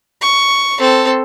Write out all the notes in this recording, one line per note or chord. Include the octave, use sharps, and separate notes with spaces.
C#6
C4 A4